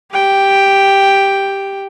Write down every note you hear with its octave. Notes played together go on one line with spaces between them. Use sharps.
G4 G5